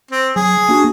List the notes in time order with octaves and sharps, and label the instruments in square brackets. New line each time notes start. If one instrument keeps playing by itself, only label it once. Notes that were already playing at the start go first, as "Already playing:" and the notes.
[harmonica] C4
[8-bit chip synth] F#3 [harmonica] G#4
[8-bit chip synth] A#3 D4 F#4